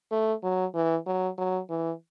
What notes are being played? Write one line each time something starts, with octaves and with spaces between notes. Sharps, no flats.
A3
F#3
E3
F#3
F#3
E3